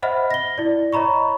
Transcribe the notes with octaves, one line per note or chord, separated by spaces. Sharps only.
C5 D#5 E5 F#5 B5 F6
A#6 G7
E4 D5
C#5 D#5 A#5 B5 C#6